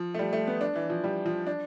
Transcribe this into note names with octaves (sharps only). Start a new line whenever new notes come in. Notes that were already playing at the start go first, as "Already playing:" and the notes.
Already playing: F3
A3
G3
A3
B3
D4
E3
F3
G3
F3
D4